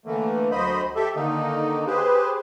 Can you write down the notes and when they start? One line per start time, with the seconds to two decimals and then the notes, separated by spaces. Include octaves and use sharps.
0.06 D3 E3 A3 A#3
0.51 D2 F#3 C5 D#5 B5
0.96 G4 A4 E5
1.15 D3 D#3 A#3 D#4
1.86 G4 G#4 B4 C5